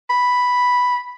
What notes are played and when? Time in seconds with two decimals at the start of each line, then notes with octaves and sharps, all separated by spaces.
0.10 B5